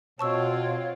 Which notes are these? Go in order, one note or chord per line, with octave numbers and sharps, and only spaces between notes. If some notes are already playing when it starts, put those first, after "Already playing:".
B2 C4 F4 C#5 F#5 A5 C#6 E6